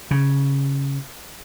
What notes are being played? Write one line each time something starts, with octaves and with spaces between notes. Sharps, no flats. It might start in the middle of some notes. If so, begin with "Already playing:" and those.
C#3